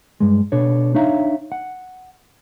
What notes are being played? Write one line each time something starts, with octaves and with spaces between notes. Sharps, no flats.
G2 G#3
B2 D4 A4 C#5
D4 D#4 C#5 E5 F5 A#5
F#5